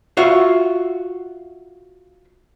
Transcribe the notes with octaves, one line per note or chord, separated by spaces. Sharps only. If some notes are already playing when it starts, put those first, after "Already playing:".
F4 F#4 E5